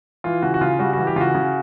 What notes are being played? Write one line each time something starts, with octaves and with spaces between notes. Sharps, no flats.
E3 F4
C#3 F#4
F#4
C#3 F4
G3 F#4
E3 F#4
G4
C#3 F4 F#4
C#3